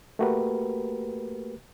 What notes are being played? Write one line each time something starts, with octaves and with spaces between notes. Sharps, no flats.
A3 A#3 F#4 G4 A#4 B4